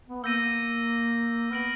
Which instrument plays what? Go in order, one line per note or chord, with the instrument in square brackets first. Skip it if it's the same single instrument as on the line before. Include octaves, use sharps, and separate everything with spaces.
[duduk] B3
[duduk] A#3 [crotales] E6 G6 A#6 D#7
[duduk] B3 [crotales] F6 A#6 D7 F#7